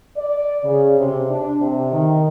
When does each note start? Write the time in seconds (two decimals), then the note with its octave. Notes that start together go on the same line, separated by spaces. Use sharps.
0.16 D5
0.63 C#3
0.98 C3
1.29 D4
1.61 C3
1.91 D#3